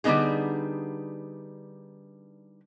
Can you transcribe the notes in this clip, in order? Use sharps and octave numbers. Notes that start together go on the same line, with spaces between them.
D3 G3 A3 B3 D#4 G#4